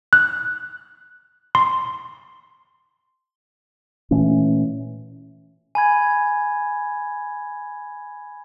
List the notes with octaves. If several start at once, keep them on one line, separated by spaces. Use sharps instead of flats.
F#6
C6
A#2 E3 A3 C#4
G#5 B5 G#6